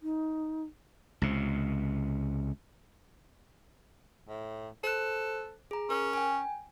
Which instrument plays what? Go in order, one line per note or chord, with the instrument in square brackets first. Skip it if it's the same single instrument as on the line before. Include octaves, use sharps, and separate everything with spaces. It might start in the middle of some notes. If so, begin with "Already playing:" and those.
[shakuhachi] D#4
[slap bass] C#2 C3
[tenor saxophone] A2
[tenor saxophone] A4 [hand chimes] C5 F#6
[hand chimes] G#4 A#5
[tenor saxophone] C#4 [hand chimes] A#4
[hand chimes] G5 G#5